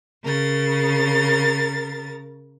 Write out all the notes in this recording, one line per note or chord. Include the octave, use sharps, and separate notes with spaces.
C#3 A#4 A6